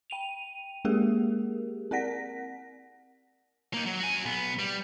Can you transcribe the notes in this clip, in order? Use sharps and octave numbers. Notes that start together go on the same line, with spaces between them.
G5 D#7 F7
G#3 A#3 G4 G#4 A#4
C4 A#4 D5 F#5 A#6 B6
A#3 D#4
F#3
F#4 G#5
B1 B3
G3